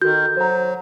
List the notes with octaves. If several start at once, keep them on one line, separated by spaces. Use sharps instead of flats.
D#3 F#4 A4 G6
F#3 C5 A#5